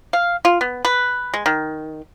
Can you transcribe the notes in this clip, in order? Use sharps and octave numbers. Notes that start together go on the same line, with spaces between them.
F5
F4
B3
B4
G#3
D#3